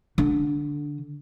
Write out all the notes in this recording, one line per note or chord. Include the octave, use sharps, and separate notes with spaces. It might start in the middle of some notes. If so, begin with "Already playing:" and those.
D3